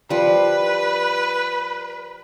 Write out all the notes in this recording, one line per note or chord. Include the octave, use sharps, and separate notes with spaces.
F3 G3 B4